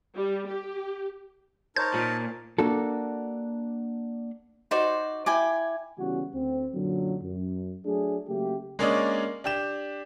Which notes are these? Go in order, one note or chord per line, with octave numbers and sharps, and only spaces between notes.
G3
G4
D#4 A#4 C5 C#5 A5 A#5 G6
A#2
A#3 D4 F#4 A4
D#4 F#4 C5 D5
E4 G5 G#5 D6
C#3 E3 G3 B3 C#4 F#4
D2 C4
F#2 A#2 D3 F#3
F#2
F#3 A3 D4 G#4
C#3 F#3 A3 A#3 G4
G#3 A#3 C#4 D4 D5 D#5
D4 G4 G6 E7